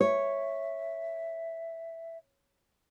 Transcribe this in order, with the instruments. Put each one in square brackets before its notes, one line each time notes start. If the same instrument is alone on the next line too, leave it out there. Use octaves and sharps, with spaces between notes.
[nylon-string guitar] C#5 [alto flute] E5